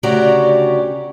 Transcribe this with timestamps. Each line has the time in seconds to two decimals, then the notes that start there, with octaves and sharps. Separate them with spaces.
0.03 D2 C#3 F#4 G4 D5 A#5